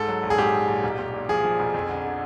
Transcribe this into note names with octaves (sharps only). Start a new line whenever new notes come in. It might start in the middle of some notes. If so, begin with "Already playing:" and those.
Already playing: G#2 A4
F#3
A#1
G#4
G#2 G4
A#1
A#1
B1
B1
A#2
F3 G#4
F3
B1
F2
D3
D3